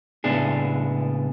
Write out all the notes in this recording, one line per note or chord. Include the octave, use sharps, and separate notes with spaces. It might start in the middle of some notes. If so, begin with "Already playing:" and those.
C#2 A2 B3 D4 G#4